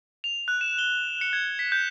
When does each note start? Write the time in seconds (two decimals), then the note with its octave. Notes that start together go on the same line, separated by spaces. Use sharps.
0.24 F7
0.48 F#6
0.61 E7
0.79 G7
1.21 C#7
1.33 G#6
1.59 B6
1.72 G6